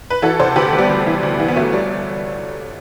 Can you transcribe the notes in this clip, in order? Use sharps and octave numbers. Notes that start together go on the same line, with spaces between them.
B4
E3 F#4 A4
C3 A4 C5
D2 G4 B4
D2
G3 B3
D2
E3
D2
E3
B3
G1 F#3 A3
G3